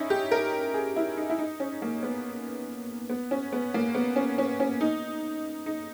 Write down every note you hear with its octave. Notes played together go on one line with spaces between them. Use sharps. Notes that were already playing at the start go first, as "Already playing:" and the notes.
Already playing: C#4 D#4 E4
G4
A#4
G#4
E4
D#4
E4
D#4
C#4
A#3
B3
B3
C#4
B3
A#3
B3
C#4
C#4
C#4
D#4
D#4